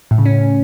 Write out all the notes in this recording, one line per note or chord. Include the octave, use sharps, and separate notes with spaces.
A2
C#3
C#4